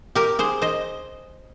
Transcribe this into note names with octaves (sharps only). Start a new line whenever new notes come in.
G4 A#4
G#4 C5
C5 D#5